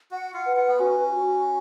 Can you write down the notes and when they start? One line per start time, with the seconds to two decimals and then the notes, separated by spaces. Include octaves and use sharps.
0.11 F#4 F#5
0.34 F4
0.45 B4
0.57 F4
0.68 B3
0.79 C#4 F#4
1.12 F#4